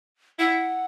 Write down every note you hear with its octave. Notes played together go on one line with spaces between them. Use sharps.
E4 F#5